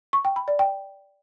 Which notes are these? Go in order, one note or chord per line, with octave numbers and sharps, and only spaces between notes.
C#6
G5
B5
D5
G5